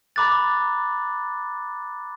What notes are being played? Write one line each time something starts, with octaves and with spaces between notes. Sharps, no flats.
A#5 B5 D6 F#6 A6